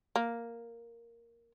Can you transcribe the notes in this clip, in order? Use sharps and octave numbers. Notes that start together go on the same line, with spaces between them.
A#3